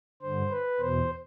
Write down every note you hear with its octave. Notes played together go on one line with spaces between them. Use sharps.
G2 D3 C5
B4
E2 B2 C5